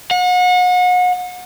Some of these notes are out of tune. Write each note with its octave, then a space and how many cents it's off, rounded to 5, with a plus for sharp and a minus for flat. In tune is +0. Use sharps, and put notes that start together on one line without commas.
F#5 -35